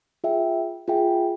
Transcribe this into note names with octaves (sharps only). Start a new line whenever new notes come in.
F4 G#4 E5 G5
F4 G#4 E5 G5